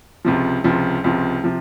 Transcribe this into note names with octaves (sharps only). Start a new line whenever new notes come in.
C#2 C3 F3
C#2 C3 F3
C#2 C3 F3
C3 F3